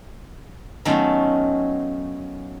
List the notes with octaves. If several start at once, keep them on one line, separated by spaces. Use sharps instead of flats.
D#3 F#3 A3 B3 C#4 F4